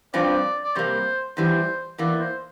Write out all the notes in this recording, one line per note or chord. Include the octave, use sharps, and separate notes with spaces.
G2 F3 C4 F4 D5
D5
C3 G3 A#3 C5
E2 E3 G3 C5
E2 E3 A#3 D5
C5